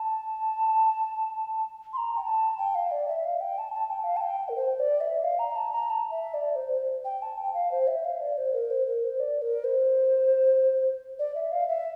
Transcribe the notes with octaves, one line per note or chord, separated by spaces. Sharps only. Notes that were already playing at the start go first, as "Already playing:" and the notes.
Already playing: A5
C6
A#5
G5
A5
G5
F5
D5
E5
F5
G5
A5
A5
G5
F5
A5
G5
A#4
C5
D5
E5
F5
A#5
A5
A#5
A5
E5
D5
C5
C5
G5
A5
G5
F5
C5
E5
F5
D5
C5
A#4
C5
A#4
C5
D5
A#4
C5
D5
E5
F5
E5